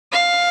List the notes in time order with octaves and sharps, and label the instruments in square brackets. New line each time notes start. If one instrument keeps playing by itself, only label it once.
[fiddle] F5